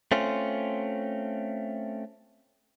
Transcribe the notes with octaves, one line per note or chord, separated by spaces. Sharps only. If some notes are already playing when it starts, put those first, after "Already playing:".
A3 C4 C#4 F4